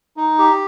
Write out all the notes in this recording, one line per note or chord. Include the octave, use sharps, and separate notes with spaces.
D#4
G4